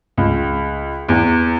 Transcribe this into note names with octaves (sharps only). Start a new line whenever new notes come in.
C#2
E2